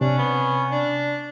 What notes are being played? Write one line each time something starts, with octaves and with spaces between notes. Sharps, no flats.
C3 C#4 D4
B3
D4